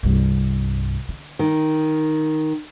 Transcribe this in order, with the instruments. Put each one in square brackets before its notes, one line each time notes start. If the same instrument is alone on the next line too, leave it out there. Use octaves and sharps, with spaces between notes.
[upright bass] C2 G2
D3
[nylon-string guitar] D#3